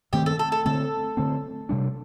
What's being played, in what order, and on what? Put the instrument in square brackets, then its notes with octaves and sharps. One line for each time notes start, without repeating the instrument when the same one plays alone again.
[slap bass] G2 D#3 A3 C4 [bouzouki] G4
[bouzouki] A4
A4
A4
[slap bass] D3 A3 C4 [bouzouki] A4
[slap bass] D3 A3 C4
C3 G3 D4